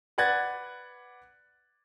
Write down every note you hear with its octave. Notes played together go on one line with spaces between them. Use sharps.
B4 D5 F#5 F#6 G#6 A6